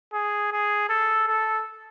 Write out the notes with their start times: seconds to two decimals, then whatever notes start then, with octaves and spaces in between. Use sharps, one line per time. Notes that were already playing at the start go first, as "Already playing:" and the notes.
0.13 G#4
0.52 G#4
0.89 A4
1.28 A4